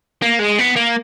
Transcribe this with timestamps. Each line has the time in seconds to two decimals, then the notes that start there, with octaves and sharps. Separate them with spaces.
0.22 A#3
0.39 G#3
0.58 B3
0.76 A#3